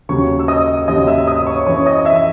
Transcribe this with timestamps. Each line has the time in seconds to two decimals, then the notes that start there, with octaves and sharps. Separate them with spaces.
0.09 D#2 C#3 F#3 C#5 C#6
0.39 E6
0.48 D#5 D#6
0.88 D#2 C#3 F#3 D#5 D#6
1.07 E5 E6
1.27 D#5 D#6
1.47 C#5 C#6
1.67 F#2 E3 C#5 C#6
1.86 D#5 D#6
2.05 E5 E6